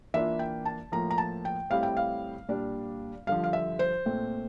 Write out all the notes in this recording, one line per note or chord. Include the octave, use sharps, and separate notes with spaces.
E3 A#3 D4 F4 E5
G5
A5
A2 F3 A#3 A#5
A#5
A5
G5
A2 G3 C4 E4 F5
G5
F5
A#2 G3 D4
G2 D3 F3 F5
F5
E5
C5
A#2 A3 C4